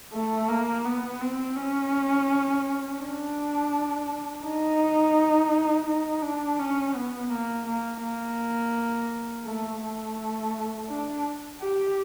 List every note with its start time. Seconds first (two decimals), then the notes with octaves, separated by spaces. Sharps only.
0.13 A3
0.49 A#3
0.85 B3
1.21 C4
1.56 C#4
3.00 D4
4.43 D#4
5.86 D#4
6.22 D4
6.59 C#4
6.94 B3
7.30 A#3
7.66 A#3
8.01 A#3
9.45 A3
9.80 A3
10.88 D4
11.60 G4